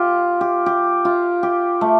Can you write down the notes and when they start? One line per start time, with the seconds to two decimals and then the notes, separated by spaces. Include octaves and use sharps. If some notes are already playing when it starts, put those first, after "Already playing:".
Already playing: F4 G4
0.41 G4
0.66 G4
1.05 F4
1.43 G4
1.81 A3